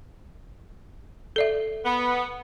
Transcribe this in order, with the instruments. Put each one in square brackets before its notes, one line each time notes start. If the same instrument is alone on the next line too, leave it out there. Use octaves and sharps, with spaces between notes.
[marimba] A4 D5 E5
[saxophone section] B3